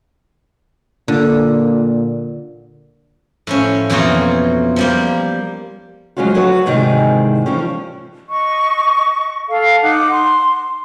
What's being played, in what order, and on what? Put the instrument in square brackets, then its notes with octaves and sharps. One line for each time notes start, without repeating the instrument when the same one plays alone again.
[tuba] A#2 [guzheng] D3
[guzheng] A2 F3 C#4
F2 B2 E3 A#3 F4 C#5
F3 G3 A#3
[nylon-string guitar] F3 F#3 G#3 C#4 F4 F#4
F#3 F#4 B4 C#5 F5 F#5
G#2 C3 D#3 E3 G3 G#3
E3 F3 G3 C4 C#4
[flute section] D#5 C#6
A4 F5
D#4 F#5 D6
C6